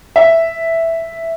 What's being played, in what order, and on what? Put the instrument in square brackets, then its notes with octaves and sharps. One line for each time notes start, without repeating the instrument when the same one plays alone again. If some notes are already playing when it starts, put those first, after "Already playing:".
[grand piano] E5